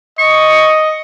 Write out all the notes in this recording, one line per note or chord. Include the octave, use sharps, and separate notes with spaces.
D#5 C#6